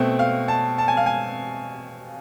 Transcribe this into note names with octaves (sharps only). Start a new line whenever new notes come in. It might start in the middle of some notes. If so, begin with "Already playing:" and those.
Already playing: B2 A3 C4
F5
A5
A5
G#5
F5
G#5